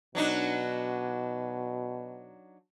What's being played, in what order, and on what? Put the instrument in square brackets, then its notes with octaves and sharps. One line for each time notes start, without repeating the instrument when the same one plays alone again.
[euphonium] B2 [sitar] F#3 D4 D#4